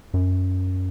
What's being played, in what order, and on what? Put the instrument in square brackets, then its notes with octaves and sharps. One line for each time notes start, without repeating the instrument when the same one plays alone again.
[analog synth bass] F#2